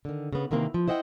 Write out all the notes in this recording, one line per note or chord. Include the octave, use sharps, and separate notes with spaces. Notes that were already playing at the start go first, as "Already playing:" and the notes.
D3 D#3
C#3 B3
C3 D#3 E3 A#3 C4
F3
E4 C5 D#5 F#5 G5